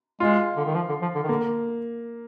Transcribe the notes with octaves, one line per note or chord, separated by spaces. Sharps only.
G#3 F4
D3
D#3
F3
D3
F3
D3
D#3
D3 A#3